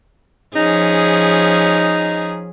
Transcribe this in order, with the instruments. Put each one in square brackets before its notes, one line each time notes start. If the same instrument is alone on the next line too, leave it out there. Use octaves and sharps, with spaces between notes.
[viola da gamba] F3 C#4 G#4 [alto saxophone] D#4